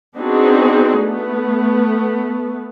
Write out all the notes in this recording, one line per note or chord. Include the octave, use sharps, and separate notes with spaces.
B3 C4 D4 D#4 F#4 G#4
A3 B3